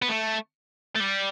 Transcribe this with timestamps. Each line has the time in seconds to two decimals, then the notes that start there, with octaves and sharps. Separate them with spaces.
0.02 B3
0.09 A3
0.96 A3
1.00 G3